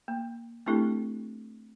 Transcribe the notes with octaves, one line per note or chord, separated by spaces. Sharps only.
A#3
A3 C4 D4 E4 G4 A4